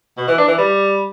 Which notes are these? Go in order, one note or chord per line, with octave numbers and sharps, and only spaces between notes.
B2
E3
D4
E3
G3